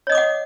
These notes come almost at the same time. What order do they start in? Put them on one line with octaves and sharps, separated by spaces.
C#5 D#5 D#6 D6 F#5